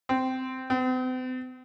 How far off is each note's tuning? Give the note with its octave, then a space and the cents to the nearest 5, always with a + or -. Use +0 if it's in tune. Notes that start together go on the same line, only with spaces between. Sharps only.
C4 -15
C4 -45